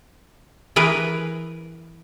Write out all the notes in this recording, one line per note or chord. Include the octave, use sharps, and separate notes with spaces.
E3 G#4 A#4 B4